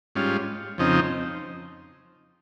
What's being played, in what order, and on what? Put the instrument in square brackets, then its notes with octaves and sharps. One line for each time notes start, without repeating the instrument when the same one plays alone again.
[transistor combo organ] G#2 G3 C#4 F4
F2 C#3 F3 C4 D#4